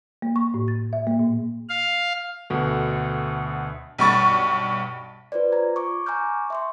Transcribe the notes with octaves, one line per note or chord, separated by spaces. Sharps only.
A#3
C#6
A2
A6
E5
A#3
A#2
F5
D2 B2 A3
B1 G2 C#6 A6
F4 B4 C5 D5
F4 A#5 G#6
C#6 D6
G#5 A#5 C#6 D6 F6 G6
E5 C6 C#6